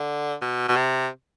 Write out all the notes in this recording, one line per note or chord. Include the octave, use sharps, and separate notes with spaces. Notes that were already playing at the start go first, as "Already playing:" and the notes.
Already playing: D3
B2
B2
C3